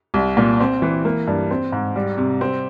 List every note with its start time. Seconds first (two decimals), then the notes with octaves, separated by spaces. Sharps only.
0.14 C2
0.37 A#2
0.60 C4
0.82 E3
1.05 A#3
1.27 G2
1.51 C4
1.72 G#2
1.96 G3
2.18 C3
2.41 C4